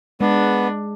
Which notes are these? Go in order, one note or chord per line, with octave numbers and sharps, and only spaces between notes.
G#3 B3 D4